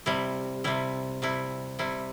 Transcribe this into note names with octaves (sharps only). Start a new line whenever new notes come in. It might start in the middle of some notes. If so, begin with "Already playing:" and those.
C3 G3 E4
C3 G3 E4
C3 G3 E4
C3 G3 E4